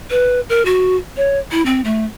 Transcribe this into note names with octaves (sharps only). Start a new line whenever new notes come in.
B4
A#4
F#4
C#5
E4
C4
A3